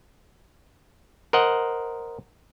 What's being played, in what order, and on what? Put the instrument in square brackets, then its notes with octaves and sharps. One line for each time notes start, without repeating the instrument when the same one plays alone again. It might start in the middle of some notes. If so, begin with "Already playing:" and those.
[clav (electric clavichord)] A#4 C5 D#5 F#5